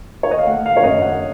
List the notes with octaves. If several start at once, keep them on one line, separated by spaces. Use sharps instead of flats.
C#5
D#5
F5
A3 F#5
F5
C#5
F#2 D#5
F#5